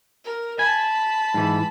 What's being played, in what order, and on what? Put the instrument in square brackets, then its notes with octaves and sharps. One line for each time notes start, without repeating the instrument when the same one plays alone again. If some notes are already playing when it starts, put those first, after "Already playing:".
[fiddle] A#4
[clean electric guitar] G#5 [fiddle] A5 B5
[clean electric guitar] G#2 E3